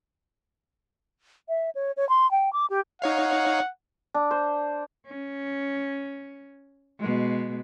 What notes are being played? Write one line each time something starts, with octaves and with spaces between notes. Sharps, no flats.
E5
C#5
C#5
C6
G5
D6
G4
D#4 C#5 F5 F#5
D4
C5
C#4
B2 G#3